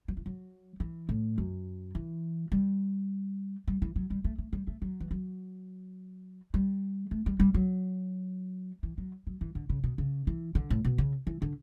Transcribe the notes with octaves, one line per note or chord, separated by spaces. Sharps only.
F#3
E3
F#3
E3
A2
F#2
E3
G3
G3
E3
F#3
G3
A3
A3
G3
A3
F#3
E3
F#3
G3
A3
G3
G3
F#3
E3
F#3
F#3
E3
D3
C#3
B2
C#3
E3
D3
A2
B2
C#3
E3
D3